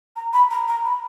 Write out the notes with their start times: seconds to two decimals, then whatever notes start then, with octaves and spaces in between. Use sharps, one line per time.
0.16 A#5
0.33 B5
0.50 A#5
0.68 A#5
0.84 B5